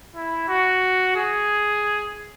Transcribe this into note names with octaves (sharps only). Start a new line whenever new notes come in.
E4
F#4
G#4